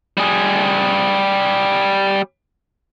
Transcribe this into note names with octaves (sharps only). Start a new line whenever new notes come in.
G3 G#4